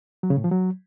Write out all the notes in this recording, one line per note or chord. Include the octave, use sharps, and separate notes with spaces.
F#3
C#3
A2
F3
F#3